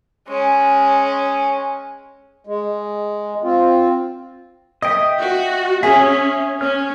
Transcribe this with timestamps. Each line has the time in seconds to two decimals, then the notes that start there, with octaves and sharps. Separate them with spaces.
0.28 G#3 C#4
2.47 G#3
3.43 C4 F4
4.82 D#5 E5 G5 D#6
5.20 F#4
5.83 C#4 G#4 E5
6.61 C#4 F6